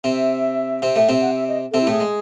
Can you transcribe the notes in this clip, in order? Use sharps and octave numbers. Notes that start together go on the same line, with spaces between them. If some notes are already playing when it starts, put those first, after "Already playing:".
C3 C4 E5
C3 C4
A2 A3
C3 C4
F#5
E5
D#5
A4
C3 C4
E4
A2 A3 G#4
G#3